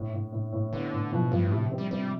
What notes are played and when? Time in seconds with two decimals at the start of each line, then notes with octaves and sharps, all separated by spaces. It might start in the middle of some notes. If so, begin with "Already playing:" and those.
Already playing: A2
0.13 A2
0.32 A2
0.52 A2
0.72 D3 B3
0.93 A2
1.12 B2 F3
1.31 G2 F3
1.51 A2 C3
1.71 C4
1.78 G3
1.91 G3 C4